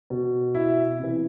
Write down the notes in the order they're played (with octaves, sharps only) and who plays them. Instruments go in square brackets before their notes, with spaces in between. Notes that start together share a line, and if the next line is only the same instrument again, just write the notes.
[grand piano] B2
E4 E5
C3 E3